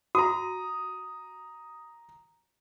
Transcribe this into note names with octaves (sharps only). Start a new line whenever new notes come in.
F#4 A#5 D#6